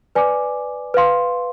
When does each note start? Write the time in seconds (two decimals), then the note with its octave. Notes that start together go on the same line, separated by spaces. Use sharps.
0.15 B4 D5 G#5 D6
0.94 B4 F5 C6